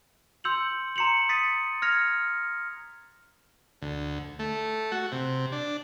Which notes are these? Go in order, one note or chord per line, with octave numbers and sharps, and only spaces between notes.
C6 E6 G6 C#7 F7 F#7
A#5 C6 C#7 F7 F#7
D#6 A6 B6 C#7 D#7
F6 G#6 A#6 C#7 F7
D2
A3
F#4
C3
D4